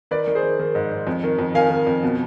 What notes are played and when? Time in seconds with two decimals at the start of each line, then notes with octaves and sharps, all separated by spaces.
0.11 D#3 B4 D5
0.27 D#3
0.35 G#4 C5
0.43 D#3
0.59 D#3
0.75 G#2
0.91 G#2
1.07 F2
1.24 D#3
1.39 F2
1.54 D#3 F5 G#5
1.70 D#3
1.87 F2
2.03 B2